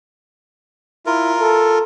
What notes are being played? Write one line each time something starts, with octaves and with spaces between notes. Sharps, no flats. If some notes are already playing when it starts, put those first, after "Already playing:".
E4 F4 A#4
A4